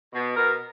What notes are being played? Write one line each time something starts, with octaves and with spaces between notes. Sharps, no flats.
B2
B2 A#4